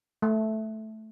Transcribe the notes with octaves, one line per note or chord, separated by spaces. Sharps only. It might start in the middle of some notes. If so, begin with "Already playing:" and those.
A3